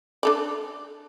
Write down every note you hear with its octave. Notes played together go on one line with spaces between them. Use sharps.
D4 A4 D5